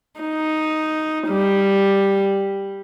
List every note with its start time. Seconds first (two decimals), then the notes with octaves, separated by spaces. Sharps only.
0.21 D#4
1.29 G3